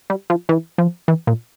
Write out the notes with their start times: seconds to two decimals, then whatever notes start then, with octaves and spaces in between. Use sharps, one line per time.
0.10 G3
0.30 F3
0.49 E3
0.78 F3
1.08 E3
1.27 A#2